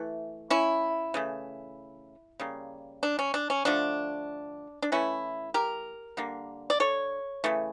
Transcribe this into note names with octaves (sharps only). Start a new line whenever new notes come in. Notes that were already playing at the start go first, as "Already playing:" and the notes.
Already playing: E3 A3
C#4 E4
C#3 E3 A3
C#3 G3 A#3
D4
C#4
D4
C#4
D3 F3 A3 D4
D4
E3 A3 C#4 E4
G4 A#4
D3 G3 A#3
D5
A4 C#5
C#3 E3 A3